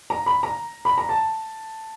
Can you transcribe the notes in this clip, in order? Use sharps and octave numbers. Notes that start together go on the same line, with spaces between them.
A#5
B5
A#5
B5
A#5
A5